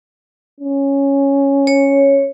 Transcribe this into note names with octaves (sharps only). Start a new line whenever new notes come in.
C#4
C#5